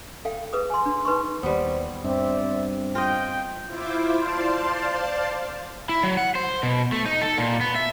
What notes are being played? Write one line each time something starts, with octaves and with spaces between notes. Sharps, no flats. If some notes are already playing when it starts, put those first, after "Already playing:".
A4 F5 G5
G#4 B4 D#6
G#5 C6
D4
D#4 B4 C6 C#6
D#2 G3 B3 C5
G2 C4 D5 E5
C4
F4 D#5 G5
E4 F4 C5 E5 D6
C5 D5 F5 A5 C6
E4
F#3
F#5
C5
B2
A3
D#4
A4
A#2
B3
E5